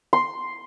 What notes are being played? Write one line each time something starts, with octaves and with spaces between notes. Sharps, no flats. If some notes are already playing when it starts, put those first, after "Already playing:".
C6